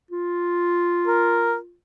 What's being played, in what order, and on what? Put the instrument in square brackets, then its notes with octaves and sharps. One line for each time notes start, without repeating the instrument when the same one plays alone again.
[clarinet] F4
[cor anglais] A#4